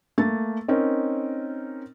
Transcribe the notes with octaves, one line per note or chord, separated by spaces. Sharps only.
A3 A#3 A6
C4 C#4 D#4 A#4